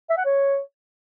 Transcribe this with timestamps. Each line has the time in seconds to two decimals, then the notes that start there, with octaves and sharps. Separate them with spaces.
0.10 E5
0.18 F#5
0.25 C#5